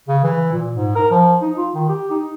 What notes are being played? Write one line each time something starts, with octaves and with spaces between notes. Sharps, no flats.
C#3
E3
A#2
G#2
A#4
F3
D#4
F4
D#3
G4
D#4